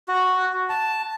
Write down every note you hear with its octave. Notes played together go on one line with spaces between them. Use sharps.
F#4
A5